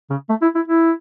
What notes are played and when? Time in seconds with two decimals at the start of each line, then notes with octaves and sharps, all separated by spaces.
0.10 C#3
0.29 A3
0.42 E4
0.55 E4
0.68 E4